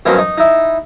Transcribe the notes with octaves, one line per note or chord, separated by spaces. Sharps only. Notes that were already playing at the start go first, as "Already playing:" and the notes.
G2 B2 F#3 A#3 C4 C#4
D#4
D#4 E4